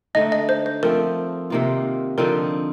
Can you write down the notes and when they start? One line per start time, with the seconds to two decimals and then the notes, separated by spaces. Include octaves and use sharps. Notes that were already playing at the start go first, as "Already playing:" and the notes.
0.15 D3 A3 D#4 D#5
0.32 D#5
0.49 C5
0.66 C5
0.83 F3 A3 C4 A#4
1.50 C3 D#3 A#3 F4
2.18 D3 F3 C4 D#4 A#4